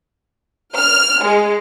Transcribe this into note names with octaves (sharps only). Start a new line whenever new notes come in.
F6
G#3